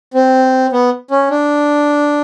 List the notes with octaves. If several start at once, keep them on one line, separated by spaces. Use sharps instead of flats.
C4
B3
C#4
D4